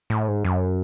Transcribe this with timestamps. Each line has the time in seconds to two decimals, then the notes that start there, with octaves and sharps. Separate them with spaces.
0.10 A2
0.28 G#2
0.45 F#2